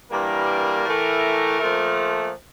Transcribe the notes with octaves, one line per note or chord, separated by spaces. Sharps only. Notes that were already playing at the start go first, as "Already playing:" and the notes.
G2 E3 G3 A#3 A#4
A2 E3 A3
A#2 F3 A3